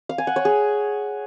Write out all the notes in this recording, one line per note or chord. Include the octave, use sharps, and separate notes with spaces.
F5
G#5
F#5
C#5
G#4